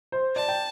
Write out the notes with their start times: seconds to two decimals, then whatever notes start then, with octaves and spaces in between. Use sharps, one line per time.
0.12 C5
0.36 D5 A5
0.49 G5